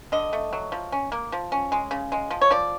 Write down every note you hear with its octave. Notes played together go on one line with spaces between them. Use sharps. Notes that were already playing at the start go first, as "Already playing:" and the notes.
D3 D#5
A3
F#3
F3
C#4
A#3
F3
C#4
G#3
C#3
G#3
F3
C#5
F3 D5